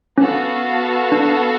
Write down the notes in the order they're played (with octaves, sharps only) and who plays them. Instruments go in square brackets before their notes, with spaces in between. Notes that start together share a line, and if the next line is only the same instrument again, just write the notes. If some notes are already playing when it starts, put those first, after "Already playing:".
[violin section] B3 F#4 A4 F5 [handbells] C#4
[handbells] D4